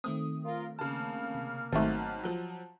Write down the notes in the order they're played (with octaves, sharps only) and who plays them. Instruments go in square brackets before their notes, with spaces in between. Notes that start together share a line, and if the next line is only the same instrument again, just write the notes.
[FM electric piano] D#3 A3 C4 [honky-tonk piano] D#6
[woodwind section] F4 A#4
[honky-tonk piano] C#3 A5 [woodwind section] A#3 F6
[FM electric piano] C3
[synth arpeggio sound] G#1 A3 [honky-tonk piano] G#2 F#3 C4 [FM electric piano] A5
[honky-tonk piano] F3 F#3